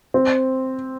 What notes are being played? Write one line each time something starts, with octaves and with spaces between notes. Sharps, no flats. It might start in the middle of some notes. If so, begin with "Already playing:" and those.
C4